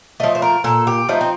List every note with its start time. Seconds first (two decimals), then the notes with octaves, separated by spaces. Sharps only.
0.20 F3 A3 D#5
0.35 C5
0.42 A#4
0.64 A#2 A4
0.87 G4
1.09 F3 A3 D#4
1.21 C4